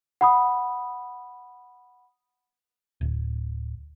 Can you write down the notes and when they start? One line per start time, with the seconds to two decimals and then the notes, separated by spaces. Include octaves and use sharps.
0.21 F#5 B5 D#6
3.01 D1